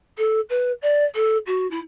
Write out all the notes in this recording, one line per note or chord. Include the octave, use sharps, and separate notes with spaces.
A4
B4
D5
A4
F#4
E4